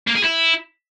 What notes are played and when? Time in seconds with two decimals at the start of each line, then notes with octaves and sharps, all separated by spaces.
0.07 A#3
0.15 G#4
0.24 E4